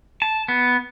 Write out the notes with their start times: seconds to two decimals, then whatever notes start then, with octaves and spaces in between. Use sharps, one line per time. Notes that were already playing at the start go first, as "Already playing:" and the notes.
0.22 A5
0.48 B3